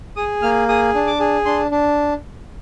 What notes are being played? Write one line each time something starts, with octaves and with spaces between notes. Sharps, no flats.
G#4 D#6
A#3 F6
G#4 D#6
D4
D6
G#4
D4 C6
D4